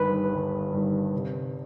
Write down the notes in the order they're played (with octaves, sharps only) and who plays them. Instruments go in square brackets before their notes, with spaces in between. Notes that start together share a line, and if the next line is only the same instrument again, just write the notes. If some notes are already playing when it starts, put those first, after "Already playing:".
Already playing: [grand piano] G1 G2 D#3 [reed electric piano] B4
[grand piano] G1
G2 D#3
C3